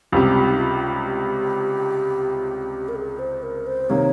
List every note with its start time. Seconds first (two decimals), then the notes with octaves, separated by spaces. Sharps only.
0.12 C#2 C3 G3 F4
0.24 G4
0.35 F4
0.49 D#4
0.60 F4
1.07 G4
2.89 A#4
2.95 G#4
3.19 C5
3.43 A#4
3.67 C5
3.90 C3 D#3 A#3 C#5